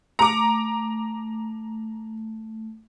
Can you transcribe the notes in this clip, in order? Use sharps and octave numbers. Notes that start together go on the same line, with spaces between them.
A3 A#5 D6